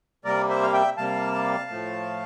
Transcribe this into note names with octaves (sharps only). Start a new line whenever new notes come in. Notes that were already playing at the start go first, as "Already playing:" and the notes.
C3 G3 A#3 A#4 D5
C5 E5
F5
E5 G5
C3 G3 A#3 F5 A5
A2 F3 A3